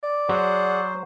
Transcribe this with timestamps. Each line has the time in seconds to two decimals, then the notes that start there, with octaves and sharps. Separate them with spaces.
0.03 D5
0.29 F#3 G#4 C5 F#5